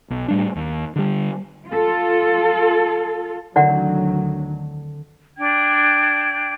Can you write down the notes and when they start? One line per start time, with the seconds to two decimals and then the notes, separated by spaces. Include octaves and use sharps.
0.10 B1
0.28 A2 G3 D4
0.55 D#2
0.96 D3 G3
1.67 F4 A4
3.56 D2 D3 D#3 F#3 C4 E4 D5 F#5
5.37 D4 G5 G#6